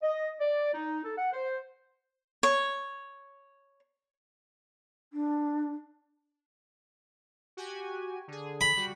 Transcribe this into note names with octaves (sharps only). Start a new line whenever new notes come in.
D#5
D5
D#4
A4
F#5
C5
C#5
D4
F#4 G4 G#5
D3 G#4
B5
G3 F#4